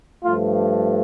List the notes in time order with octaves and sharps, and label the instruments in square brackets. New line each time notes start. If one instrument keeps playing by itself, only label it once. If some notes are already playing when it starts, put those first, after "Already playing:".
[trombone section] G2 F3 A3 F4